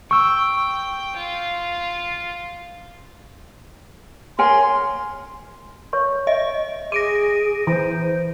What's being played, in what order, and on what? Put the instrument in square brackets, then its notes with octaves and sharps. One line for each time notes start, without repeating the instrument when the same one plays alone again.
[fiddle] G5 [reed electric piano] C#6 E6
[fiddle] F4
[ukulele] A#4 C#5 G#5 [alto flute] C6
[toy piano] C#5 C#6
[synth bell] D#5 [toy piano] E5
[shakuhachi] G#4 [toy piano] D6 [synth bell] A#6 D7 D#7
[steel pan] E3 [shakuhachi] C5 [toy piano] A#5